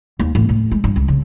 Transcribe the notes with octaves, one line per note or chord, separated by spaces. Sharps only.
D#2
A1
A2
G#3
G2
C#2
C#3